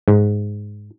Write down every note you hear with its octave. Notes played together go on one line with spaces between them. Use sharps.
G#2